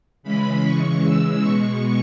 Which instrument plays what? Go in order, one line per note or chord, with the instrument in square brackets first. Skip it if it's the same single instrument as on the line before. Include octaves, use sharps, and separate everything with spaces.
[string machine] C#3 E3 G#3 B5
C#3 E3 G#3 C#6
C#3 E3 G#3 E6
B2 G#3 C#6